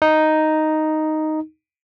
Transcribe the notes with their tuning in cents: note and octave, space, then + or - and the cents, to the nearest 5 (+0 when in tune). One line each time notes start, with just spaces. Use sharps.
D#4 +0